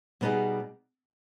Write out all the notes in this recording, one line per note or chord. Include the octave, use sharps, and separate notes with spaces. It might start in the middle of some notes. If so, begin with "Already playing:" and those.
B2 G3 B3 D#4 G#4